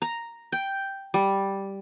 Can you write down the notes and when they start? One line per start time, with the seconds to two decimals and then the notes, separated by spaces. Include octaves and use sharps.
0.02 A#5
0.52 G5
1.14 G3